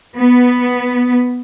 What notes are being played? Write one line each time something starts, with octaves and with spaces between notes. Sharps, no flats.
B3